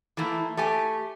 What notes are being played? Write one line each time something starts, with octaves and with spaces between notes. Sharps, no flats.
E3 A3 A#3 E4
A3 G4 G#5